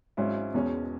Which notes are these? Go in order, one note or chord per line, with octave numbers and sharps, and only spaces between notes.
G#1 G#2 F#3 C#4 E4
E1 E2 B2 G#3 C#4